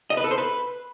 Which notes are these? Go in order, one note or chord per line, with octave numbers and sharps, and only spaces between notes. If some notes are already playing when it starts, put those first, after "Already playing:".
D#5
B4
A4
C5
B4